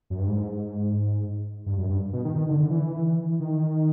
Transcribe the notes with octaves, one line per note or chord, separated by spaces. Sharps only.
F#2
G2
G#2
G2
F#2
G2
B2
D#3
D#3
D3
D3
E3
D#3